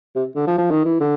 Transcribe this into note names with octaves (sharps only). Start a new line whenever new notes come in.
C3
D3
F3
F3
D#3
E3
D3